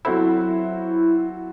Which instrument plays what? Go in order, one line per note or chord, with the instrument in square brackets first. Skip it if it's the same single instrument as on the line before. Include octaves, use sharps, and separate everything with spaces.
[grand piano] F#3 C4 F#4 A4 C5 [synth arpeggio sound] E4